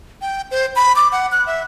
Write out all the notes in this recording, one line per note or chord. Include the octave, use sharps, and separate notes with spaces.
G5
C5
B5
D6
F#5
F#6
E5